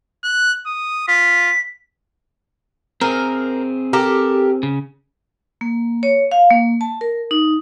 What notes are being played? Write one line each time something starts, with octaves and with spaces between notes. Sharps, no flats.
F#6
D#6
F4 B6
C4 G#4 A#4
G4 A4 A#4
C#3
A#3
C#5
F5
A#3
A5
A#4
D#4